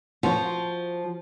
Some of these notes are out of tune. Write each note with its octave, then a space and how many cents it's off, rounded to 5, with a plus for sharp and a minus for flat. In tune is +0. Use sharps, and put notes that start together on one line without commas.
F3 +0 F#4 -10